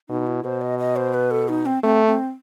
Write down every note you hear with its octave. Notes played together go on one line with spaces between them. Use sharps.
B2 D#4
E4
B2 C5
D#5
D#5
C5
B4
A4
D#4
C4
A3 C4
C4